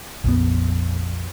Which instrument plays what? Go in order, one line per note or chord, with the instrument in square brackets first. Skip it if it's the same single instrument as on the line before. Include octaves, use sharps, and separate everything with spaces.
[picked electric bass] A#1 F2 B3